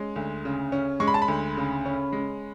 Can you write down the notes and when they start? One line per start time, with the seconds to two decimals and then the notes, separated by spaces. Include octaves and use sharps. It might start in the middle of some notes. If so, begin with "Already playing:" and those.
Already playing: G#3 C#4
0.16 D2
0.45 C#3
0.72 C#4
1.00 G#3 C#6
1.08 B5
1.14 A5
1.22 B5
1.28 D2
1.57 C#3
1.85 C#4
2.12 G#3